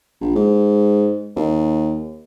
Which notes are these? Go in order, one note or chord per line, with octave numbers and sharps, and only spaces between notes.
A#1
G#2
D#2